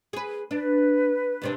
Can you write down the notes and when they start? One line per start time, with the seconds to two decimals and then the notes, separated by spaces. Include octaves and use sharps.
0.13 G#4 B4
0.51 D4 B4
1.42 D#2 C3 D4